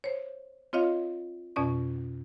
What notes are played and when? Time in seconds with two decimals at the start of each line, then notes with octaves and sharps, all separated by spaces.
0.04 C5 C#5
0.73 C4 F4 C#5 D#5 F5
1.56 F2 B2 C#4 D5 C#6